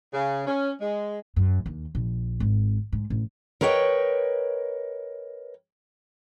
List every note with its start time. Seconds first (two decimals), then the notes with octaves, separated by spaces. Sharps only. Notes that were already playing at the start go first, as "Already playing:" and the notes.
0.14 C#3
0.47 C#4
0.81 G#3
1.36 F#2
1.66 D#2
1.95 A#1
2.40 G#1
2.92 G#2
3.10 A1
3.61 A#4 B4 C#5 D#5 G5